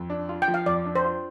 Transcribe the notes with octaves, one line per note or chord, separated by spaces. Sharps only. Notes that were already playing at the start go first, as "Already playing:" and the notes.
Already playing: F2
D4
F4
G5
F3
F5
F2 D5
D4
C5
F4